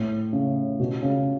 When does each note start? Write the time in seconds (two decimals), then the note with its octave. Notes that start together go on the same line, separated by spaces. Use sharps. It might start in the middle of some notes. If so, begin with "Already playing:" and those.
Already playing: A2
0.33 C#3
0.80 B2
1.02 C#3